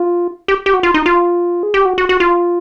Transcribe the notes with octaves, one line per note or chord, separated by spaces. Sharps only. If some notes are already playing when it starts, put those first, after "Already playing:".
Already playing: F4
G4
G4
F#4
F4
D#4
F4
G#4
G4
F#4
F#4
F#4
F4